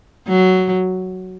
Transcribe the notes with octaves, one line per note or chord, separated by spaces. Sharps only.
F#3